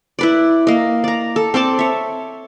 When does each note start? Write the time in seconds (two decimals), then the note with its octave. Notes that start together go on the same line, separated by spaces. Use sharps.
0.19 E4 B4 D5
0.67 A#3 D#5
1.04 D5 A#5
1.36 A4
1.54 C4 A4 D5 A5
1.79 C#5 E5